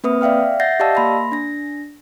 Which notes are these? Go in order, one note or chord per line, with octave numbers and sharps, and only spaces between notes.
A#3 C4 B4 E5 D#6
D5 E5 F5 G5 F6
E5 F#5 G6 A6 A#6 C7
G4 D5 D#5 F5 A5 E6
A#3 B5 C6 A#6
D4 A#6